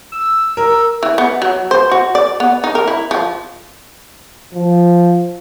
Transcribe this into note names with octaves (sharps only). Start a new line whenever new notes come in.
E6
A#4
E3
B3
F#3
C5
F#4
D5
B3
D#4
A#4
E4
F3
F3